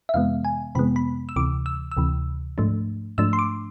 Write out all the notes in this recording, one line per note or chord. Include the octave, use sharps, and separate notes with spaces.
E5
F2 C3 E3 G#3 B3 F5
G#5
F2 C3 E3 G#3 B3 B5
B5
E6
D2 C3 E3 D6
E6
E6
D2 C3 E3
G#2 F3 A3 D4
G#2 F3 A3 D4 E6
C6
D6